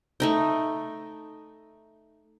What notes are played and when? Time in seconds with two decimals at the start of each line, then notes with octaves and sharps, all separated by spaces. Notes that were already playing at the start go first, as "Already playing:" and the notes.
0.20 A3 D#4 G5